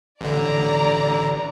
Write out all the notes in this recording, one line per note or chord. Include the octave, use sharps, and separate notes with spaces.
A1 D3 D5 A#5